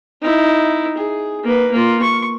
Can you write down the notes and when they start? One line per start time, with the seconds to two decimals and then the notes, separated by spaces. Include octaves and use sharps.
0.22 D#4 E4
0.97 G#4
1.44 A#3 B4
1.72 A#3 F4
2.02 C#6